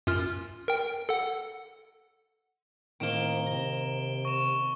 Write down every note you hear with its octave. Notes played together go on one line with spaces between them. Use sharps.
F#2 F4 F6
A#4 G5
A4 F#5
A2 D#3 A#3 C4 D7 E7 G7
C3 A#5
C#6 E7